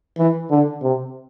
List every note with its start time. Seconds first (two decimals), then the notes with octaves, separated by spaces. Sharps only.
0.18 E3
0.50 D3
0.82 C3